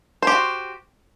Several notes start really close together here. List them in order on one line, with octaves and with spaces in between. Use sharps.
C5 G4 F#4